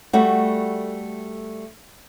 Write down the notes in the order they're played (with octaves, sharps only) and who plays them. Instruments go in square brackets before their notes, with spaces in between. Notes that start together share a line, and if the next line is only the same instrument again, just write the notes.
[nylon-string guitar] G3 A3 F#4